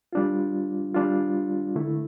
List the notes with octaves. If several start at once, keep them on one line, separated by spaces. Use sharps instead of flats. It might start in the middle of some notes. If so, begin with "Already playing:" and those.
G3 D4 F4
G3 D4 F4
D3 A3 E4